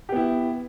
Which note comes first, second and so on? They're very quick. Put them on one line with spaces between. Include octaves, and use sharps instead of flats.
G4 B3 E4